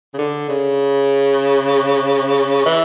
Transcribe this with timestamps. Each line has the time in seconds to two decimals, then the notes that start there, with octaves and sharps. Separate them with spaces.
0.14 C#3
0.18 D3
0.49 C#3
2.66 E3